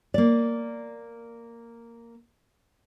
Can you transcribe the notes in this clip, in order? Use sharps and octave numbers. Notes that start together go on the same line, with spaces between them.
A#3 D5